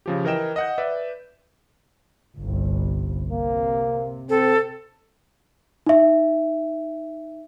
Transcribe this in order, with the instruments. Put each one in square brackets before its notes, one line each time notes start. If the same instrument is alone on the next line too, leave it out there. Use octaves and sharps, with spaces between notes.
[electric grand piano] C#3 F3 G4
E3 A#4 D#5 G5 E7
D#5 F#5 G6
B4 D5 E5
[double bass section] G1 C2
[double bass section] C3 [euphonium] A#3
[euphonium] C4 [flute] A4
[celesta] D#4 E5